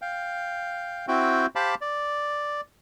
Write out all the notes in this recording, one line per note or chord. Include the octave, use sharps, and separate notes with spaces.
F5 G5
C4 E4 F#4 G5
G4 C5 F5 A5 B5 D6
D5